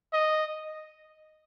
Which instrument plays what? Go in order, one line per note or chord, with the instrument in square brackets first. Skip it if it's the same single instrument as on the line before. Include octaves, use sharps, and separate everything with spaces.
[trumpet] D#5